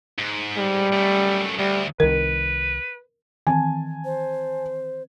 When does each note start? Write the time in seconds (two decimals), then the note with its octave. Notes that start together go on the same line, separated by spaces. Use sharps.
0.19 G#2
0.57 G3
0.93 F#2 A3
1.59 D2 G3
2.00 C2 D#3 A#4 B4
3.47 D#3 E3 C4 G#5 A5
4.05 C5